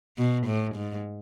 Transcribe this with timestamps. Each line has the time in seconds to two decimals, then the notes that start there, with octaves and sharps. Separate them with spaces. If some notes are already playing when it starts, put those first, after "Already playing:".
0.17 B2
0.47 A2
0.75 G#2